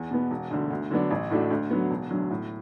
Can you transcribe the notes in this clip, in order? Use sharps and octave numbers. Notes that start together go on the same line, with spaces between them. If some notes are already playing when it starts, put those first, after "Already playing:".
Already playing: E2
B2 B3
E1
D2 D3
D2
D3 F#3 B3 D4
A1
A2 A3 D4 F#4
D2
D3 F#3 B3
E1
D2 D3 F#3
A2